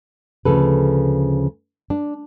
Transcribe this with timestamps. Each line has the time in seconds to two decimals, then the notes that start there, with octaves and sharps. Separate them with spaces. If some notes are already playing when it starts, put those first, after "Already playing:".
0.45 D2 C#3 F3 A4 B4
1.90 D4